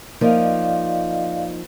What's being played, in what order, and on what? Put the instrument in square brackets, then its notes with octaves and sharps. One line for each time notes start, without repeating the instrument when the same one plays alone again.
[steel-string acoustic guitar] F3 A#3 D#4 [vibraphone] D5 D#5 F5